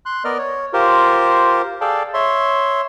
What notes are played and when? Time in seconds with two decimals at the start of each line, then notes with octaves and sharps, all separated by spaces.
0.06 C6 F#6
0.24 B3 A#4 D5 D#5 F6
0.38 C#5
0.73 F4 G4 A#4 C5
1.81 G#4 A4 D5 F5 G5 A5
2.14 C#5 E5 C6